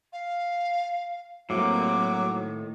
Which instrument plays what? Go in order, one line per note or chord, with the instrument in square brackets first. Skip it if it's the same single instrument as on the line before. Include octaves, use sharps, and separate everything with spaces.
[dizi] F5
[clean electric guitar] A2 [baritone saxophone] F#3 [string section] G3 A#3 C4 [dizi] D6
[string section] D#3